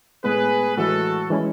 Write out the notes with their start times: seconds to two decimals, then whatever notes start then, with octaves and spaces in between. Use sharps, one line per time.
0.24 A2 G#3 B3 G#4 B4
0.77 A2 E3 G#3 F#4 A4
1.30 E3 G#3 C#4 E4